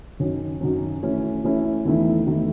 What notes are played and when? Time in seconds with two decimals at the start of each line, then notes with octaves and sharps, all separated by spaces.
0.19 F#2 D#3 F#3 C#4
0.61 F#2 D#3 F#3 C#4
1.03 E3 A3 C#4 E4
1.44 E3 A3 C#4 E4
1.85 E2 D#3 A3 E4
2.26 E2 D#3 A3 E4